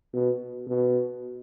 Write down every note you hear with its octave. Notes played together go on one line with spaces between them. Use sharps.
B2
B2